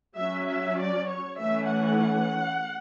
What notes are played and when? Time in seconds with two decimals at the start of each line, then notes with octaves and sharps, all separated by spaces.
0.17 F#3 C#4 E5
0.48 E5
0.78 D5
1.07 C#5
1.37 E3 A3 C#4 E5
1.69 F#5